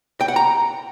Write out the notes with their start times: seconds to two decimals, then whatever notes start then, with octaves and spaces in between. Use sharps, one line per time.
0.21 G5
0.28 F#5
0.36 A#5